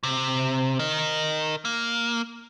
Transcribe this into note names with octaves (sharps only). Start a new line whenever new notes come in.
C3
A#4 D#5
A#3